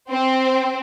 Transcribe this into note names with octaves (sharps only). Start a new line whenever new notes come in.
C4